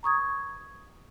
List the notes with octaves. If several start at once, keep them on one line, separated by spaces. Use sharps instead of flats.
A#5 C#6 D#6 G#6